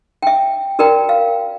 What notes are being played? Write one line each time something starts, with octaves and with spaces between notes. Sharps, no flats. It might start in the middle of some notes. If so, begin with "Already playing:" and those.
E5 G5
F#4 A#4 D5 G5 A#5
F5